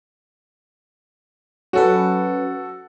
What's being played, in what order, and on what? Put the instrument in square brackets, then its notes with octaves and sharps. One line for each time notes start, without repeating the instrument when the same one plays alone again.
[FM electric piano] F#3 C#4 B4 [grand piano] F#4 A4